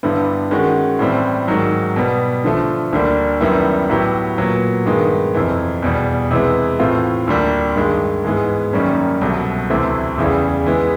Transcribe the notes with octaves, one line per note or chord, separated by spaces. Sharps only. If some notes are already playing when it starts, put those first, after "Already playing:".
G2 D3 G3 B3 E4
D#3 G#3 C#4 F#4
A2 E3 G3 C4
G#2 D#3 F#3
B2 G3 B3
D3 F3 A3
D2 D3 G3 A#3 D4
F#2 D#3 G3 B3 E4
A2 F#3 B3 E4 G4
A#2 F#3 B3
G2 D#3 G#3 B3
F2 C3 E3
E2 B2 G3
C3 E3 G#3 B3
A2 E3 A3 C4 F4
D2 D3 G3 A#3
G2 D#3 G#3
G#2 E3 G#3 B3
F#2 D#3 G3 A#3 C#4
C2 B2 F#3 A3
D2 C3 E3 A3 C4
E2 C#3 E3 G3
E3 G#3 B3